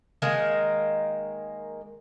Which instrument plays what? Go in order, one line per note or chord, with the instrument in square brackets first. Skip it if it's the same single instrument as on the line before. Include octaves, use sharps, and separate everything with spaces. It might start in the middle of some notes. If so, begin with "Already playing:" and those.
[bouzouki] D#3 G#3 A#3